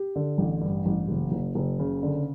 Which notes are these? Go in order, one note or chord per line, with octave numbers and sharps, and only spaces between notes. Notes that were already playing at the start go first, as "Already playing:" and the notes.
Already playing: G4
D3
A1
G2
A1
F#1
F#1
F#1
C#3
D3